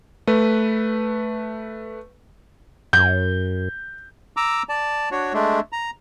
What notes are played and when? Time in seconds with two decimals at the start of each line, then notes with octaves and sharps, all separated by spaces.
0.27 A3 B4
2.93 F#2 G6
4.37 A#5 D6 E6
4.69 D5 A5
5.11 D4 F#4 C#5
5.33 G#3 A3 D4
5.72 A#5